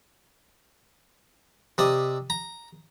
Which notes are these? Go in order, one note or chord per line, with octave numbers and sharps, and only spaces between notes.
C3 D5 D#5
A#5